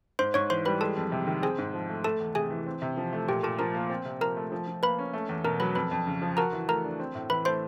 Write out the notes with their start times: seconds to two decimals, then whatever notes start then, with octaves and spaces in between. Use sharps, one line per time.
0.19 G#2 C5 C6
0.34 G#2 C#5 C#6
0.50 E3 C5 C6
0.65 G3 B4 B5
0.81 G#3 A4 A5
0.96 F2
1.12 C3
1.27 D#3
1.42 C4 G#4 G#5
1.58 G#2
1.74 F3
1.89 A3
2.04 A3 A4 A5
2.20 E2
2.35 C3 G#4 G#5
2.50 E3
2.66 C4
2.82 C3
2.97 F3
3.13 A3
3.28 A#2 G4 G5
3.43 A#2 A4 A5
3.59 F3 A#4 A#5
3.75 A#3
3.90 C4
4.05 C3
4.21 F3 A#4 A#5
4.37 A3
4.52 F3
4.67 F3
4.83 A#3 B4 B5
4.99 C#4
5.13 A3
5.29 E2
5.44 B2 A#4 A#5
5.60 F#3 B4 B5
5.75 F2 B4 B5
5.91 F2
6.07 C#3
6.22 F3
6.37 F#4 A#4 A#5
6.53 E3
6.68 A3 A#4 A#5
6.83 D4
7.00 C4
7.15 A2
7.30 E3 B4 B5
7.45 A3 C5 C6